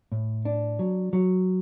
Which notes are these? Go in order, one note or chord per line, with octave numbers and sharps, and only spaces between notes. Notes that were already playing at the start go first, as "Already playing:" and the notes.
A2
D4
F#3
F#3